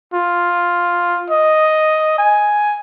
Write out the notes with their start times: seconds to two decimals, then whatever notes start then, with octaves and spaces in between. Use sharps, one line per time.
0.14 F4
1.30 D#5
2.19 G#5